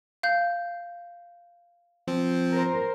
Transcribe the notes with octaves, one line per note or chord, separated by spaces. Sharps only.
F5 G6
F3 C4
A#4 C5